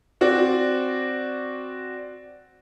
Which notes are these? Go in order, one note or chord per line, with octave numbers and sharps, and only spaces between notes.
C4 F#4 D5